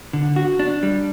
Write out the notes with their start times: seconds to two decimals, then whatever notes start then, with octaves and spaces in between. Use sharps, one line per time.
0.13 D3
0.36 F#4
0.59 D4
0.83 G3